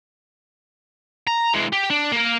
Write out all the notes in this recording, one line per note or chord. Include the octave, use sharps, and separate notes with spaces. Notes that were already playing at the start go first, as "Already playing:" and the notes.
A#5
E3 G#3
G4
D4
A#3 A#4